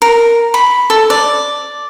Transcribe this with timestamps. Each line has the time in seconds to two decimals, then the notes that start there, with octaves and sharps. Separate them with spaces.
0.02 A#4
0.54 B5
0.90 A4
1.10 D5